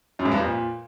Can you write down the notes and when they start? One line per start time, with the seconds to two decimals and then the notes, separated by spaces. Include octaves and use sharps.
0.19 F#2
0.25 G#2
0.32 G2
0.38 F2
0.44 A#2